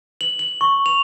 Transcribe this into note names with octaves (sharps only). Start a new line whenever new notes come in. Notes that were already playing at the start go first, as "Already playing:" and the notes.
F#7
F#7
C#6
F7